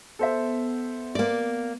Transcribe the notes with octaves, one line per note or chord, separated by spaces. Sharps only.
B3 A4 C5 E5
A#3 D5